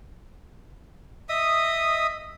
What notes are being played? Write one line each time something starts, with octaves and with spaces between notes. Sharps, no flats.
D#5 E5 D#6